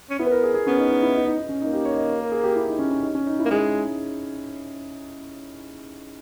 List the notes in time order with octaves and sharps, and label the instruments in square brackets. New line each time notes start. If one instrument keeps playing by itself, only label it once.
[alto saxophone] C#4
[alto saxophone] B3 [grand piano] E4
[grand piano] B4
A#4
G#4
G#4
[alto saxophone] B3 [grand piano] C#4
[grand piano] D#4
D#4
E4
D#4
D#4
D#4
C#4
[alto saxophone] A#3 [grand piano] D#4
[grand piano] G4
C#5
D#5
C#5
A#4
G#4
G4
E4
D#4
C#4
C#4
D#4
C#4
D#4
E4
[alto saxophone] A#3
[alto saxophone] G#3 [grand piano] G#4